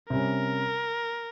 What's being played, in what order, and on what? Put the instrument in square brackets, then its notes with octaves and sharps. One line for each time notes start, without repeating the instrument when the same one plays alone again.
[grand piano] C3 G3 C#4 [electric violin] A#4